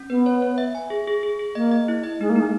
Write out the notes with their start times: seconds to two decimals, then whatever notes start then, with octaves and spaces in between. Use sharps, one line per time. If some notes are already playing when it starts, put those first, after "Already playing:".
Already playing: C#4
0.10 B3 B4
0.26 C#5
0.42 C#5
0.58 E5
0.75 G#5
0.90 G#4
1.07 G#4
1.23 G#4
1.39 G#4
1.55 A#3 D#5
1.71 D#5
1.88 E4
2.04 D#5
2.20 G#3 D#4
2.30 A#3
2.36 G#3 D#4